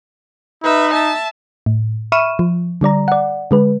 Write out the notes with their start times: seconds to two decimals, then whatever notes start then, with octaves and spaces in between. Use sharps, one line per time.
0.64 D#4 B4 E5
0.94 E5 A5
1.66 A2
2.12 E5 B5 C#6 F6 D#7 E7
2.39 F3
2.81 D3 G3 D5 A#5
3.08 D5 F#5
3.51 D3 G#3 B4